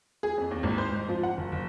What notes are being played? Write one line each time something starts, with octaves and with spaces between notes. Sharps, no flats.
G#4
F2
D#2
G#1
C5
G#2
F3
F#5
F#1
F#1